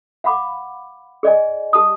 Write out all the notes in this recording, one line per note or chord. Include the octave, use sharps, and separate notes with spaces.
F5 F#5 B5 D6
G#4 D5 D#5 G#5
G4 A5 D#6